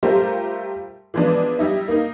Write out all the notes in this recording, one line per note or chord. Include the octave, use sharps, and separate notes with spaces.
G3 A3 F4 G4 A#4 C5
E3 F3 G#3 B3 D4
G3 D#4 E4
A#3 D#4